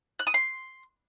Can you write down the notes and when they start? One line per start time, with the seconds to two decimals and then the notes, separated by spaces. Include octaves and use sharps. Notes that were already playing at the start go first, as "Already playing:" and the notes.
0.19 F#6
0.27 D#6
0.34 C6